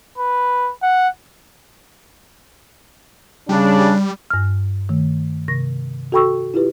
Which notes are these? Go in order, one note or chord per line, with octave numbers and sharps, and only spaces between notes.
B4
F#5
C#3 G3 D4
G2 F6
D#3 A3
C3 A#6
F#4 A4 G5 B5 C#6 E6
E4 F4 G4 B4